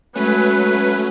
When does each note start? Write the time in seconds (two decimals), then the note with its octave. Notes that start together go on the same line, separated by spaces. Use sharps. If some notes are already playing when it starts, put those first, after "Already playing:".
0.15 F#3 G#3 A3 C#4 B4